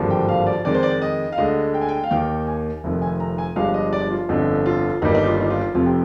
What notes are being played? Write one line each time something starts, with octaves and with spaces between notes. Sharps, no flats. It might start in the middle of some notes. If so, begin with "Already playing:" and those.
Already playing: G#1 G2 D3 F3 A#3
G5
F5
D5
F2 D#3 G#3 D5
C5
D5
D#5
F5
D2 D3 G#3 D#5
G5
G#5
G5
F5
D#2 D#3 A#3 G5
G#5
F1 F2 D#3
G#5
A#5
G#5
G1 G2 F3 G#3 F5
D#5
D5
F4
G1 F2 D3 D#4
F4
G1 G2 D#3 G3 A#3 D#4
D#4
F4
D#4
F4
F1 F2 C3 F4
G4